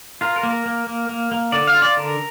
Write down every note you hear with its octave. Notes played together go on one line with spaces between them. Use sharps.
F4 A#4
A#4
A#3
A#4
A#3
A#3
A#3
A#3
D3 D5
F5
F4
D5
D3 A#4